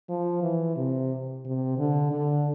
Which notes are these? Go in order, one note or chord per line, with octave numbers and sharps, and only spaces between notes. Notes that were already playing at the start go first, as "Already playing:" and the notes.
F3
E3
C3
C3
D3
D3